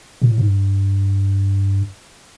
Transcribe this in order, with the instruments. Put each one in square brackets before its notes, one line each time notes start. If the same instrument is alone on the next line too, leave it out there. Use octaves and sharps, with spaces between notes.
[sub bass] A#2
A2
G#2
G2